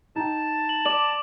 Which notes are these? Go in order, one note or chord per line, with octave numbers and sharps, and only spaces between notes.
D#4 G5 A5
F#7
D5 D6 F#7